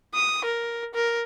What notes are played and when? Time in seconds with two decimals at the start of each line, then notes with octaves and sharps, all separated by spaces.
0.15 D#6
0.45 A#4
0.94 A#4